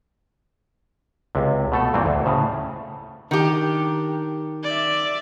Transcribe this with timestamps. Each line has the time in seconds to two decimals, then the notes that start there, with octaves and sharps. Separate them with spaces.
1.35 C#2 C3
1.72 B2 A3 A4
1.93 G2 A#2 E3 C4
2.06 D2
2.26 A2 C#3
3.31 D#3 D4 G4
4.64 D5 E5